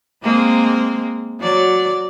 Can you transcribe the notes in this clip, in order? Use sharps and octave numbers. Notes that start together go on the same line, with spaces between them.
G#3 A#3 C4
F#3 D5